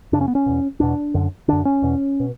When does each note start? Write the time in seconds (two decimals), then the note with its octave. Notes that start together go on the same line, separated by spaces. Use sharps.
0.12 F#2 C#3 D4
0.21 C#4
0.28 B3
0.35 C#4
0.46 E2 B2
0.80 E2 B2 D4
1.14 F#2 D3
1.48 F#2 D3 D4
1.65 C#4
1.82 E2 B2
2.20 B2